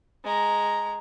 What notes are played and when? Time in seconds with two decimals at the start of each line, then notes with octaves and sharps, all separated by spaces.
0.24 G#3 A#5